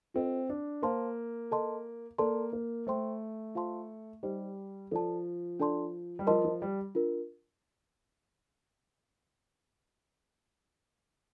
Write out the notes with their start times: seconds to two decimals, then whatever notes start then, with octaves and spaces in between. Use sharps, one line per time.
0.14 C4 F4 A4 C5 D#5
0.49 D4
0.82 A#3 C5 F5 A5 C6
1.51 A4 D#5 A5 C6
2.18 A#3 A4 D5 A5 C6
2.53 A#3
2.87 A3 C5 G5 C6
3.55 F4 C5 F5 A5 C6
4.23 G3 D#4 G4 C5 D#5
4.91 F3 A4 D5 A5
5.60 D4 A4 D5 A5 C6
6.19 G3
6.27 F3 A#4 D#5 A5 C6
6.45 F3
6.62 G3
6.95 D4 F4 A#4